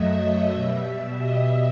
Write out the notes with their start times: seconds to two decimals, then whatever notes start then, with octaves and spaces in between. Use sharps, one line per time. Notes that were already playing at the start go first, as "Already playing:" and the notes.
Already playing: F#2 F#3 A3 D#5 E5
0.53 B2 G3 E5
1.19 D#5